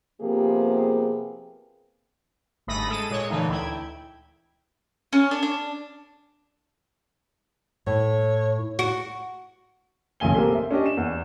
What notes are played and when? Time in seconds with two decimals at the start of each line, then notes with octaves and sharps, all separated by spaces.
0.22 C3 F3 A#3 B3 G4 G#4
2.67 G1 G#2 A3 B5 D#6 A#6
2.88 G#3 A4 D#7
3.11 A#2 G#3 C#5
3.30 A#2 D3 E3 A3 D#4
3.49 D2 E4 G5 G#6
5.13 C#4
5.31 D4
5.43 D4
7.87 A2 C#5
8.79 F#4
10.20 B1 A#2 C#3 G#5 G7
10.34 A3 A#3 C4 G4 A4 A#4
10.55 E5
10.71 C#4 D4 G4 D#5
10.86 E7
10.97 E2